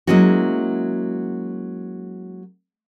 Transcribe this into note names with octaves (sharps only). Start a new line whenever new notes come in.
F#3 G#3 A#3 C#4 E4 F#4